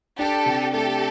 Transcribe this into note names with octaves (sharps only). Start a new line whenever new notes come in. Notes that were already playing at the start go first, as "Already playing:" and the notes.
D4 G4 A4
C3
A3 G4 A4